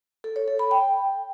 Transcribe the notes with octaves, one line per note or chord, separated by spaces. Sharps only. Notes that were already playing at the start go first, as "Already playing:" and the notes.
A4
C#5
A4
B5
G5